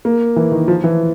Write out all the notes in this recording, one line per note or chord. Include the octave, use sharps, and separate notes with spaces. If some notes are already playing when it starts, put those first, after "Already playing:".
A#3
E3
D#3
F3
E3